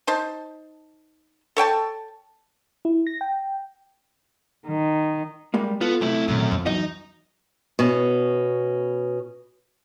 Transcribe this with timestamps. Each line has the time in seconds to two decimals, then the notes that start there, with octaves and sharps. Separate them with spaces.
0.07 D#4 C5 A5
1.57 A4 C#5 G5 A5
2.85 E4
3.07 A#6
3.21 G5
4.67 D#3
5.54 G3 G#3 A#3
5.81 B3 F4 A4
6.01 F#2 C3 A3 E4
6.28 A#1 F#2 D#3
6.51 F2
6.66 F#2 E3 F#3 D#4 D#5
7.79 B2 C#4